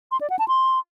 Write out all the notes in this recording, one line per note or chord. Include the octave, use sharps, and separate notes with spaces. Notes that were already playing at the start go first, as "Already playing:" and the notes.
C6
D5
F#5
A5
C6